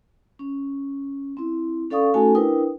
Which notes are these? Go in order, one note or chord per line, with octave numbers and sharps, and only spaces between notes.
C#4
C4 E4
C#4 A4 D5 F5 C#6 D#6
A3 C#4 D#4 F#4 A4 G#5
D4 E4 A#4 B4 G5 D#6